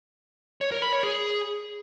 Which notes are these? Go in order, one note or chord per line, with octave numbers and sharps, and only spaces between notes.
C#5
A#4
B5
C#5
G#4